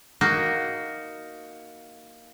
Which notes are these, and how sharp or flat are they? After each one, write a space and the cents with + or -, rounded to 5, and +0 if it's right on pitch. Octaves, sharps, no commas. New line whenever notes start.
A#3 +0 D#4 +0 F#4 +15